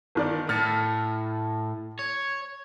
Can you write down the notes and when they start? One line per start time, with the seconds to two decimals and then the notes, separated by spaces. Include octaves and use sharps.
0.15 G1 D#3 D5
0.49 A2 F6 A6 C#7
1.99 C#5